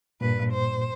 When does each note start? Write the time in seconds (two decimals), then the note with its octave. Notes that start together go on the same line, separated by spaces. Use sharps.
0.21 G2 A#2 B4
0.53 C5